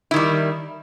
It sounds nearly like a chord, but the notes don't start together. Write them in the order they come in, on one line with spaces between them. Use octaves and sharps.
E4 D#3 G3